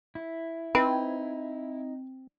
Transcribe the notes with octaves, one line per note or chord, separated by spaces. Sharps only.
E4
C4 D#4 B4